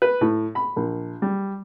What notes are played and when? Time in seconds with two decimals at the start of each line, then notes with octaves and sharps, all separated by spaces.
0.02 B4
0.21 A2
0.55 B5
0.76 A#1
1.22 G3